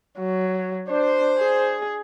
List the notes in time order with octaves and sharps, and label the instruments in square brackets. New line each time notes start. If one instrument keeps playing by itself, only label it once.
[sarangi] F#3
[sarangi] D4 [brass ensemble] C5
[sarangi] G#4